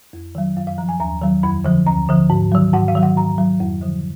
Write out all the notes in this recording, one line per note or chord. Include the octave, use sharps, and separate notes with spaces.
F2
D#3 F#3
F#2 F5
F5
F3 A#5
G#5
D#2 A#5
D#3 F#3
F2 B5
D3 F3
D2 A#5
D3 F3
G#2
D#3 F#3
G#2 F#5
F5
D#3 F#3
F#5
G#2 A#5
F#3
F2
D3 F3